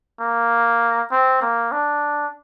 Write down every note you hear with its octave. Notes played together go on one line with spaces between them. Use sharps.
A#3
C4
A#3
D4